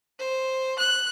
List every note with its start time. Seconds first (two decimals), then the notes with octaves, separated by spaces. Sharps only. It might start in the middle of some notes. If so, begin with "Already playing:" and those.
0.19 C5
0.79 F#6